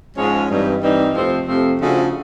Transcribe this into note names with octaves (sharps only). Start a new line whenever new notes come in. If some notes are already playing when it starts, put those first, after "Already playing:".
G#2 F3 G#3 C#4
G2 E3 G3 C4 D#4
G2 E3 G3 C4 D#4
F2 C3 F3 A3 C4
F2 C3 F3 A3 C4
C#3 F3 A3 D4 F#4